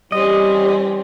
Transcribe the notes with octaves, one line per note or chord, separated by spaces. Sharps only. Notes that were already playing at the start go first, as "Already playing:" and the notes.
E3 G3 C4 C#4 G4 D#5